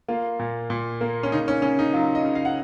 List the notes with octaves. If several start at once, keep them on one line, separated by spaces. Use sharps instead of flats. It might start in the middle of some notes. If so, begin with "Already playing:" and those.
A#3 F4
A#2
A#2
A#3
C#4
C#3 D#4
C#4
C#3 C#4
D#4
F#3 F4
D#5
C#3
F5
F#5